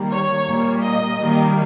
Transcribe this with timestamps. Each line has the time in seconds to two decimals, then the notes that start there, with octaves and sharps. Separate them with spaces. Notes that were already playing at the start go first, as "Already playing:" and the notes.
Already playing: D#3 G3 A#3
0.11 C#5
0.48 A#2 G3 A#3
0.85 D#5
1.20 D#3 G3 A#3